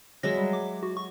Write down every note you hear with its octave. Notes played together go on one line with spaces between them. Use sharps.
F#3 G#3 E5 A#6
G3
D6
F#4
C#6